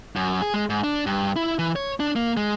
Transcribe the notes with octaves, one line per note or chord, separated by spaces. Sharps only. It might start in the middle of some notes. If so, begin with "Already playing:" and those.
F#2
G#4
G#3
G#2
D4
G2
E4
E3
C#5
D4
A#3
G#3